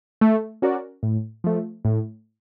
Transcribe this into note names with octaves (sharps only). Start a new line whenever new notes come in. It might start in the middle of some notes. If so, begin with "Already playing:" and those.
A3
C#4 F#4 A#4 D5
A2
F3 A3
A2